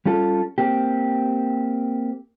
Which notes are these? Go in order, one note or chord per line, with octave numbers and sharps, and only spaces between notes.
G3 C#4 F4 A4
A#3 C4 G4